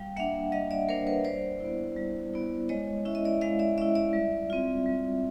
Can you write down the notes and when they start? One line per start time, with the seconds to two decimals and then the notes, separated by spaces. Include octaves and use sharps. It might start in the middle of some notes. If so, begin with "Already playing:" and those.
Already playing: G3 F5 G5
0.16 A#3 D4 E5 F#5
0.52 G3 D#5 F5
0.71 D5 E5
0.88 A#3 D4 A#4 C5
1.06 B4 C#5
1.25 G3 C5 D5
1.60 B3 E4
1.96 G3
2.34 B3 E4
2.69 G#3 C#5 D#5
3.05 C#4 E4 E5
3.15 D#5
3.25 D5 E5
3.41 G#3 D#5 F5
3.59 D5 E5
3.78 C#4 E4 D5 E5
3.95 D5 E5
4.13 G3
4.50 C4 F4
4.86 G3